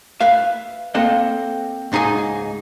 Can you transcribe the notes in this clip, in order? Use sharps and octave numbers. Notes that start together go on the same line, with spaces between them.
B4 E5 F5
A#3 C4 A4 D#5 F#5
C#2 G#2 D#4 G#4 G#5